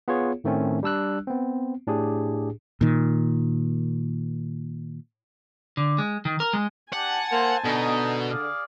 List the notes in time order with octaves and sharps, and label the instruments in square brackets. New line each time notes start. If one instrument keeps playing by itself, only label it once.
[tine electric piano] B3 F4 G#4 C#5
A2 D#3 A3 C4 C#4
G3 D4 E6 F#6
B3 C4
A2 D4 G4 G#4
[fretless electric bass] A#2 D#3
[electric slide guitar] D3
G#3
D#3
A#4
G#3
[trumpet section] D4 G4 [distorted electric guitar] F#5 [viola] G#5 A5
[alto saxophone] A#3 [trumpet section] A4 C5
[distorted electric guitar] B2 [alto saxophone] D3 [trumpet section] D#4
[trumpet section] G#4 D5 F5